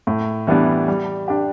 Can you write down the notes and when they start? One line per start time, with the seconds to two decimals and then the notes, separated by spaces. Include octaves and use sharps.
0.07 A2
0.47 E3 G3 B3 D4
0.88 G3
1.28 D4 G4